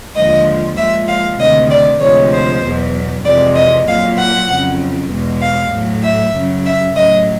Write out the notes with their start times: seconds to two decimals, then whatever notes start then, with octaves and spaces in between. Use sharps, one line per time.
0.15 D#2 D3 F3 G#3 D#5
0.77 A#2 F3 G#3 E5
1.08 F5
1.39 D2 C3 D#3 D#5
1.70 D5
2.01 D2 C3 F3 G#3 C#5
2.32 C5
2.63 E2 B2 F#3
3.25 F2 C3 E3 G#3 D5
3.56 D#5
3.87 A#2 F#3 F5
4.17 F#5
4.48 F2 C#3 F#3
5.10 E2 B2 G#3
5.42 F5
5.72 A2 F#3
6.04 E5
6.34 F#2 C#3 F#3
6.65 E5
6.96 A2 F#3 D#5